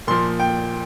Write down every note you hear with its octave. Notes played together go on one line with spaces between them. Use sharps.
A#2 F3 C6
G5